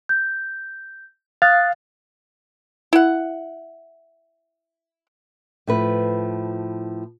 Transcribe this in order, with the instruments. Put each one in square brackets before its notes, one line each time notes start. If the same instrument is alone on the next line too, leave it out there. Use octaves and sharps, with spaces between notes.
[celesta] G6
[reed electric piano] F5 [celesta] D#6 F#6 A6
[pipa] E4 F#5
[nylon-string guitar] A2 F3 B4